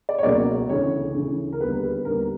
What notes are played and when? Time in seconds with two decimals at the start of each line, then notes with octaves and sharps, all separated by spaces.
0.09 D5
0.18 C#5
0.23 C#2 B2 F#3 A#3 D5
0.69 D2 C#3 E3 C#5
1.14 D2 C#3 E3
1.53 A#4
1.60 D#2 D3 G3 B3 B4
1.83 B4
2.05 D#2 D3 G3 B3 A#4